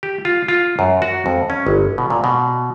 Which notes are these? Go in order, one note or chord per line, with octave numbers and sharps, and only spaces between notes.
G4
F4
F4
F#2
F#4
F2
C#4
G1
B2
A#2
B2